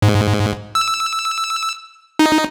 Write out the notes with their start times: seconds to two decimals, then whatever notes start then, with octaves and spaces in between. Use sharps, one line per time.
0.02 G#2
0.75 E6
2.19 D#4